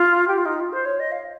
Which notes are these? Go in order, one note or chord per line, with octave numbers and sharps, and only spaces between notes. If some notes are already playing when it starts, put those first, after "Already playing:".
Already playing: F4
G4
F4
D#4
F4
C5
C#5
D#5
F5